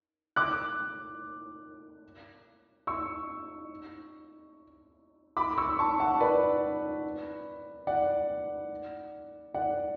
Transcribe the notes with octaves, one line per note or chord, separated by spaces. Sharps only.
D6 F#6
C#6 E6
B5 D6
C#6 E6
A5 C#6
F#5 A5
B4 D5
D5 F#5
D5 F#5